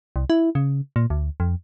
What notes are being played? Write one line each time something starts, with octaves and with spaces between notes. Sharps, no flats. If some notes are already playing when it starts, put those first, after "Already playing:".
C2
E4
C#3
A#2
D2
F2